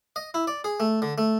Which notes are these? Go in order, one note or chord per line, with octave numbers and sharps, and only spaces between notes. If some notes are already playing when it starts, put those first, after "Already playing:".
D#5
E4
D5
G#4
A3
D3
A3